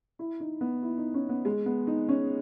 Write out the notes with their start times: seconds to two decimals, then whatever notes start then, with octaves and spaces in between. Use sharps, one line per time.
0.19 E4
0.40 D#4
0.61 B3
0.83 E4
0.98 D#4
1.14 C#4
1.29 B3
1.45 G#3
1.66 B3
1.87 D#4
2.09 C#4